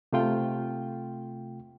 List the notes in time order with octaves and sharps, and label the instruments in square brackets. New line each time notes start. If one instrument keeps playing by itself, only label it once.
[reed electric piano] C3 A3 F4 G5